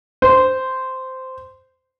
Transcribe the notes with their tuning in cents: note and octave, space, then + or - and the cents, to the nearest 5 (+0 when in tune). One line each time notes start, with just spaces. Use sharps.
C5 -10